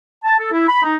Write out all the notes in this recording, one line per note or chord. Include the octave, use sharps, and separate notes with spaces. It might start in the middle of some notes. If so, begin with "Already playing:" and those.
A5
A4
E4
B5
D#4